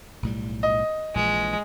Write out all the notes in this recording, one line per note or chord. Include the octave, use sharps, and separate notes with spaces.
B1 A2 G3
D#5
A#1 A#2 E3 G#3